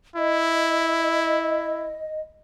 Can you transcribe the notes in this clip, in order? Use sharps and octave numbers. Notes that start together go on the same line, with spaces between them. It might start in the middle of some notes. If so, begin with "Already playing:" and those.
E4 D#5